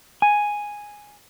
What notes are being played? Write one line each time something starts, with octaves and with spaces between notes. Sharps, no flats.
G#5